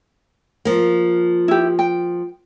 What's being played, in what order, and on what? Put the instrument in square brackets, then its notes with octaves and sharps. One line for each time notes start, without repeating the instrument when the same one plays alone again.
[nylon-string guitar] F3 A#3
[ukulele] E4 G4
G5